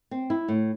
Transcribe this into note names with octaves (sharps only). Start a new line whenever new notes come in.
C4
E4
A2